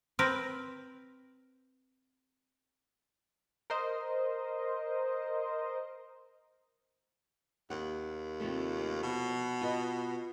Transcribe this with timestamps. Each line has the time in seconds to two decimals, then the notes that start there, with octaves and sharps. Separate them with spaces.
0.19 C4 A#4 B4
3.70 A#4 C5 D#5
7.70 D#2 F#5
8.40 C3 F3 A3
9.02 B2
9.61 F4 B4 D#5